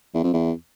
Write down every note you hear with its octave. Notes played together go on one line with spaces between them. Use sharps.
E2
F2
E2